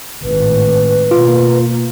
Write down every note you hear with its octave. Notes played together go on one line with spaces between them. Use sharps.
G#1 A2 B4
B2 A#3 F4